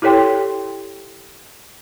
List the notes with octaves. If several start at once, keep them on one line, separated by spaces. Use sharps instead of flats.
E4 G4 A4 C#5 G5 C6